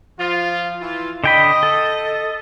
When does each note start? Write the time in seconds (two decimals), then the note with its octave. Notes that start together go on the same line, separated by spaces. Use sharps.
0.18 F3 F4
0.80 E3 F4
1.24 D3 D#5 G5 B5
1.63 A4